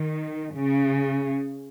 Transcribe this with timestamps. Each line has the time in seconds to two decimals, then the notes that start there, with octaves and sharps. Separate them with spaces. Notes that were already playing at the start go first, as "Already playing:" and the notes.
Already playing: D#3
0.54 C#3